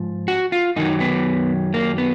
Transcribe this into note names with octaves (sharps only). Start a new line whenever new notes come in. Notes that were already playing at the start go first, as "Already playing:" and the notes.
Already playing: G#2 F3
F#4
F4
F#2 D#3 F#3 D#4
B3
A#3
B3